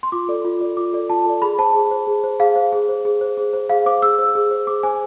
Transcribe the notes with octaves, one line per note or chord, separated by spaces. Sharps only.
C6
F4 D6
A4 D5
F4
A4 D5
F4 D6
A4 D5
F4 A5
A4 D5
G#4 B5
C5 A5
G#4
C5
G#4
C5
G#4 F5
C5
G#4
C5
G#4
C5
G#4
C5
G#4 F5
C5 D6
G#4 E6
C5
G#4
C5
G#4 D6
C5 G#5